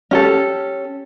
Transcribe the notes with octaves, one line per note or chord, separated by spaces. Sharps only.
C#4 G4 A4